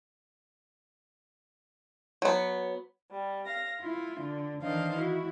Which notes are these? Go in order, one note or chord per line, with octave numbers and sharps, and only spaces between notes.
F#3 B3
G3
F5 A#6
E4 F4
D3
D#3 E3 D4 C5 D#5 F5
E4 F#4